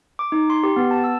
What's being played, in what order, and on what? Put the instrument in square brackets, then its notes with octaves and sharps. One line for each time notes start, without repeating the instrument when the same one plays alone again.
[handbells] D6
D#4
C6
G4
B3
A5
E6